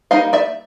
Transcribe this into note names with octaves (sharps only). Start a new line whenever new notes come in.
G3 A#3 D#4 D#5 F5
D5 E5